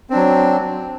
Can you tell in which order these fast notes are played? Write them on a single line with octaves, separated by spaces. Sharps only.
C4 D4 F#3